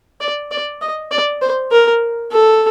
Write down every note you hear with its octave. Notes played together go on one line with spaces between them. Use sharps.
D5
D5
D#5
D5
C5
A#4
A4